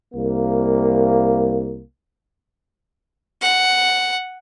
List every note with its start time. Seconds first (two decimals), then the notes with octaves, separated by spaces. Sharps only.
0.14 C2 A#3
3.42 F#5